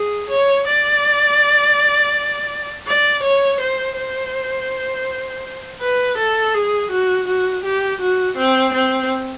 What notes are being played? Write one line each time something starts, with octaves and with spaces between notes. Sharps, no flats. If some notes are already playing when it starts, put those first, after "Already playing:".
Already playing: G#4
C#5
D5
D5
C#5
C5
C5
B4
A4
G#4
F#4
F#4
G4
F#4
C4
C4